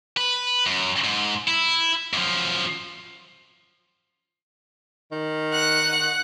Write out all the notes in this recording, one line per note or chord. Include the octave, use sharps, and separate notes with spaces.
B4
F#2
G#2
E4
F#2 F3
D#3
F#5 F#6